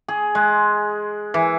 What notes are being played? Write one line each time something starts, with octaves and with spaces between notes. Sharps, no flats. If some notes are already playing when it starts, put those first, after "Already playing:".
G#4
G#3
E3